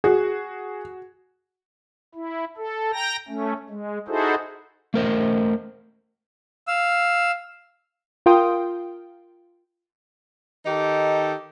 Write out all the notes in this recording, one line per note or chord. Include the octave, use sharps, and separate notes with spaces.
F#4 G#4
E4
A4
G5 A#5 A#6
A3 C#4
G#3
D#4 E4 F#4 G#4 A4 C5
A3 A#4 C5 D#5
F5 E6
F4 A#4 F5 G5 C6 D#6
D#3 D#4 G4 A4